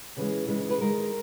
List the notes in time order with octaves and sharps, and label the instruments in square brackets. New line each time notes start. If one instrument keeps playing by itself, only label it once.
[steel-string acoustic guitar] C#3 E3 G#3
C#3 E3 G#3
B4
D#3 G#3 A#4